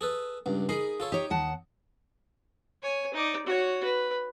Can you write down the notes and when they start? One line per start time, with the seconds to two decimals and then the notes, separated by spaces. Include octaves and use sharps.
0.01 G#4 A4 B4
0.46 C#2 G2
0.69 D#4 G#4 A#4 B5
1.00 F4 A4 C#5
1.12 D#4 G4 C#5
1.30 D#2 F#5 A5
2.83 C#5 G#5
3.14 D#4 D5
3.46 F#4 C#5
3.84 B4